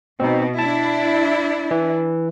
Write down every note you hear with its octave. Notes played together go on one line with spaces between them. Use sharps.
B2 C4 D#4
D4 E4 A5
E3